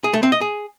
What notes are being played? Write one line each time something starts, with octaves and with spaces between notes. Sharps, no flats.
G#4
A3
C4
D#5
G#4